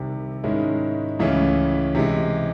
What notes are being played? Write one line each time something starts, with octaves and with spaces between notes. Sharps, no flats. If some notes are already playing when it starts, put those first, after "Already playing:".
Already playing: C2 C3 D#3
G#2 D#3 G#3 C#4 E4
C#2 C#3 E3 A3 C#4
C3 E3 G#3